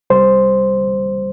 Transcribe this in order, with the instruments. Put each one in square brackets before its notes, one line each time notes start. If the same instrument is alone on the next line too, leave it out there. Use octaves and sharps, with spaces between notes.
[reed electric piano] C2 C3 G3 C5